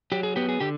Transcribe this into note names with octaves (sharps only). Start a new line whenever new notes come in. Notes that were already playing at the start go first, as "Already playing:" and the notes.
F#3 G4
G#4
B3 G4
G#4
D3 G4